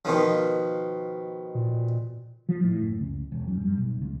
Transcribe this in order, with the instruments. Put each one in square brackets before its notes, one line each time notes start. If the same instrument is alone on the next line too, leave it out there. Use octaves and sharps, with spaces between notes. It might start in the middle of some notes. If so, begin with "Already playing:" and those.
[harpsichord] B2 D#3 F3
[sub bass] A#2
[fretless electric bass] F3
A2
F#1
C#2
E1
F#2
G2
B1
C#2